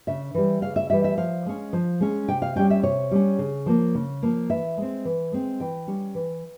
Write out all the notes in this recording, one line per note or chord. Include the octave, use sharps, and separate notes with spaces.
C#3 E5
E3 G3
C#3 F5
E5
E3 G3 E5
E5
F3 F5
G#3 C#4
F3
G#3 C#4
C3 G5
F5
G3 C#4 G5
E5
C3 C#5
G3 C#4
C#3
F3 A#3
C#3
F3 A#3
E3 E5
G#3 C4
E3
G#3 C4
E3 G5
G3 C#4
E3